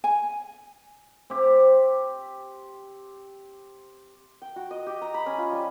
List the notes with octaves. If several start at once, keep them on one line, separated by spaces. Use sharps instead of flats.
G#5
C4 G4
G5
F#4
D#5
G4
A#5
B5
C#4
F4
G3